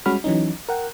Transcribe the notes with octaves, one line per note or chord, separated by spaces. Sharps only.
G3 G#3 C#4 F#4 B5 F6
E3 F#3 C#4 D#4
A#4 F#5 G5